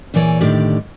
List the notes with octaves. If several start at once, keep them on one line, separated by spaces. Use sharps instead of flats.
E2 A#2 E3 C#5 D5 G#5
A2 D3 D#3 G4 D5